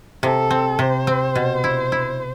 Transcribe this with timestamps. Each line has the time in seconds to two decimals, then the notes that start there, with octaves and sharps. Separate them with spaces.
0.23 C3 A4
0.51 C4
0.79 C3 C5
1.07 C4
1.36 B2
1.64 E4
1.92 E4